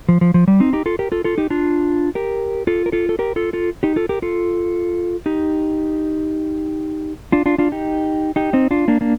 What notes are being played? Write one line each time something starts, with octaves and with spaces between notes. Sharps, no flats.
F3
F3
F3
G3
C4 D#4
D#4 G4
F4 A4
G4 A#4
F4 A4
F4 A4
D#4 G4
D4 F4
G4 A#4
F4 A4
A#4
F4 A4
A4
G4 A#4
F4 A4
F4 A4
D#4 G4
F4 A4
G4 A#4
F4 A4
D#4 G4
D4 F4
D4 F4
D4 F4
D#4 G4
D#4 G4
C4 D#4
D4 F4
A#3 D4
A#3 D4